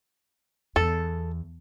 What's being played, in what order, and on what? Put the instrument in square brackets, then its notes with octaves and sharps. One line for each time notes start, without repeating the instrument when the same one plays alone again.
[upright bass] E2 [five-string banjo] A4